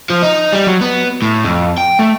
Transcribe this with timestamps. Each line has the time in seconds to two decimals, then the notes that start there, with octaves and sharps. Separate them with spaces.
0.10 F3
0.23 D#4
0.53 G3
0.67 F#3
0.81 B3
1.22 A2
1.44 F2
1.78 G5
1.99 A3